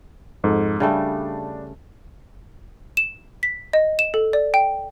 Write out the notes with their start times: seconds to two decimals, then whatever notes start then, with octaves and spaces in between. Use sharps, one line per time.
0.44 F2 G#2 A4
0.80 C#3 G3 A3 D4
2.97 E7
3.43 B6
3.73 D#5
3.99 E7
4.14 A4
4.33 D5
4.54 G5